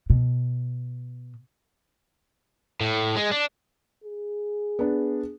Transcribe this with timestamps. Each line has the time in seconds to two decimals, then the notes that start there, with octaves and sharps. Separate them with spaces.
0.10 B2
2.81 A2
3.16 G#3
3.31 D4
4.04 G#4
4.79 B3 D4